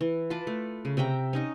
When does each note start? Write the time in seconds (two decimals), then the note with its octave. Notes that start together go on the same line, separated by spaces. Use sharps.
0.01 E3
0.30 F4 B4 A5 D6
0.47 A3
0.85 C#3
0.97 C3 E5 G5 A#5
1.33 C#4 D#4 D#5